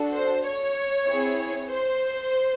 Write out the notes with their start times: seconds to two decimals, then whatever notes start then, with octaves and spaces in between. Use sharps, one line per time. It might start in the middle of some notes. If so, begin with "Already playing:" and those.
Already playing: D4 F#4 A4
0.14 C5
0.45 C#5
1.07 C4 E4 G#4
1.70 C5